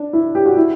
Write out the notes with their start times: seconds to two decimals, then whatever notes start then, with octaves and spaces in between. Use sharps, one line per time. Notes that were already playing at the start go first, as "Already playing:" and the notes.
Already playing: D4
0.13 E4
0.35 G4
0.46 F#4
0.57 E4